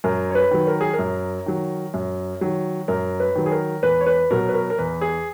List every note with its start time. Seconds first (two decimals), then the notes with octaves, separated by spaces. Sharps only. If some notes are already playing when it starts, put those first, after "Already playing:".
0.04 F#2 A#4
0.31 C#5
0.35 B4
0.51 D#3 F#3
0.67 A#4
0.81 G#4
0.93 A#4
0.99 F#2
1.46 D#3 F#3
1.94 F#2
2.41 D#3 F#3
2.88 F#2 A#4
3.20 B4
3.36 D#3 F#3
3.46 G#4
3.52 A#4
3.83 E2 B4
4.01 C#5
4.07 B4
4.31 B2 F#3 A#4
4.49 B4
4.54 A#4
4.70 A#4
4.78 E2 B4
5.01 G#4